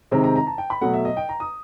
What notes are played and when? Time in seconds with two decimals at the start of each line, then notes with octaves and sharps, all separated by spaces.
0.11 C3 D#3 G#3 C4 A#5
0.24 A#5
0.36 A#5
0.47 A5
0.58 G5
0.70 B5
0.81 B2 F#3 A3 F#5
0.94 E5
1.05 D#5
1.17 G5
1.29 A#5
1.40 D#6